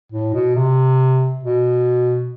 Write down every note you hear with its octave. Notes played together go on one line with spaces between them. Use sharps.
A2
B2
C3
B2